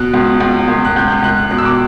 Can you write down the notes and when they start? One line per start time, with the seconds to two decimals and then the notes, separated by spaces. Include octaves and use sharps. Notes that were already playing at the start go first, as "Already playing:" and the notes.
Already playing: B2 F#6
0.14 C#2
0.41 C#2
0.68 C#2
0.85 F#6
0.96 C#2 G6
1.23 C#2 F#6
1.50 B2 F#6
1.58 E6
1.65 D6